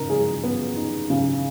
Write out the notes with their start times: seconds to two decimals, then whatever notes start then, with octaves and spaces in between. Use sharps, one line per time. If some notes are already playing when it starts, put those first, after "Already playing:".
Already playing: C#3 D#4 A#4
0.10 G#3 G#4
0.43 B3
0.76 D#4
1.10 C#3